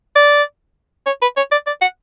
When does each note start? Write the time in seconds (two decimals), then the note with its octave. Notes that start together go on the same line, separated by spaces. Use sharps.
0.16 D5
1.06 C#5
1.22 B4
1.37 C#5
1.52 D5
1.67 D5
1.81 F#5